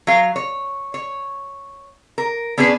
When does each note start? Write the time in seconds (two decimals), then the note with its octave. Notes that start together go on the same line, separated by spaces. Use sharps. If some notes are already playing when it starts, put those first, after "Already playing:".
0.07 F#3 F5
0.36 C#5
0.94 C#5
2.18 A#4
2.58 B3 C#4 D4 G#4 B4